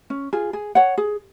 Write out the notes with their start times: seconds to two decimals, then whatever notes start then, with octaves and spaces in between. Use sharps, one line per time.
0.10 C#4
0.33 F4 G#4
0.53 G#4
0.75 C#5 F#5
0.98 G#4